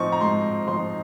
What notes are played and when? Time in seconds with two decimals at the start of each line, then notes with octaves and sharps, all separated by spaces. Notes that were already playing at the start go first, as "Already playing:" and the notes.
Already playing: F3 C4 D#4 C#6
0.12 A#5
0.21 G#2 C6
0.68 F3 C4 D#4 C6